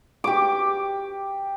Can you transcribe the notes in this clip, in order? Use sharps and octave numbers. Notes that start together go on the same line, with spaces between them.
G4 D6